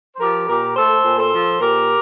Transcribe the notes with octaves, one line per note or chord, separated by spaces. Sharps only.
C5
F3 G4 A#4
A#2 G4 A#4
A3 A4 C5
A#2
A4 C5
F3
A#2 G4 A#4